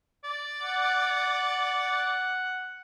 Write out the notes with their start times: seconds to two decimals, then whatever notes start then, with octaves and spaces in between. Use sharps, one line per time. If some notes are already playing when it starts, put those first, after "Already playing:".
0.24 D5
0.62 F#5